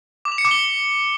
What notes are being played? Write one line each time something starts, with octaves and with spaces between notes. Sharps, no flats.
D6
F7
C#7
D6
G7